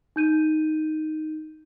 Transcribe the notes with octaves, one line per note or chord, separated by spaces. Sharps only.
D#4 G6 D#7